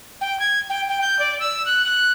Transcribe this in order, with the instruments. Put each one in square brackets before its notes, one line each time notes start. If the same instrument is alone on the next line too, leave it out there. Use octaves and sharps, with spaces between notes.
[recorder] G5
G#6
G5
G5
G6
D5
E6
F#6
F#6